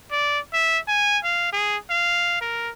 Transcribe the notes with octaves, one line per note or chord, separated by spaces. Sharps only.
D5
E5
G#5
F5
G#4
F5
A#4